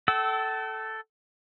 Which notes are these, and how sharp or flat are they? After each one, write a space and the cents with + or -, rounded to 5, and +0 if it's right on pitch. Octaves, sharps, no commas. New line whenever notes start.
A4 +0 G5 -45 E6 -20